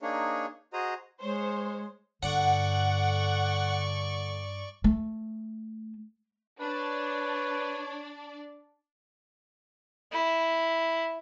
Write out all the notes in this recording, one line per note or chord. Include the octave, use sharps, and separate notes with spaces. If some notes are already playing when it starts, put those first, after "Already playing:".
A#3 D4 D#4 G#4 C#5
F#4 G#4 C5 D#5 A#5 D#6
G#3 C5 C#5
G2 D3 D5 F#5 C#6
A3
D4 B4 C#5 D5
E4